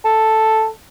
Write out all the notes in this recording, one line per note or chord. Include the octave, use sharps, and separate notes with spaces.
A4